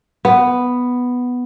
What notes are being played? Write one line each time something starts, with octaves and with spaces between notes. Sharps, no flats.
B3